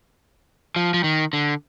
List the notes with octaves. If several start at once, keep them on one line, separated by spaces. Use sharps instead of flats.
F3
F3
D#3
D3